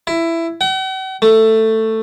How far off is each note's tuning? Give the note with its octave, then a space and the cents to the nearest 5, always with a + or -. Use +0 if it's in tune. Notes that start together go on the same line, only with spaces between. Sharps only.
E4 +15
F#5 +45
A3 +10